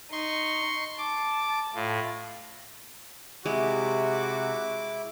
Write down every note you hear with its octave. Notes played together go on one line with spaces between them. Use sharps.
D#4 C6 C#6
A5 D6
A2 F4
C3 G#3 E4 F#4 D6